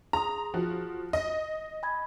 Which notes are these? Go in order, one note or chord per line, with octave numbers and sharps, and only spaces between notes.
G#4 A#5 C6 D#6
F3 F#4
D#5 A#6
G#5 B5 G#6